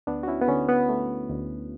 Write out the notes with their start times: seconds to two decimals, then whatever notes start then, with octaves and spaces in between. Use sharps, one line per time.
0.07 D2 B3 D4
0.23 F#4
0.28 C#4 E4
0.42 B3
0.48 D3 C#4
0.69 B3
0.89 A3
1.30 D2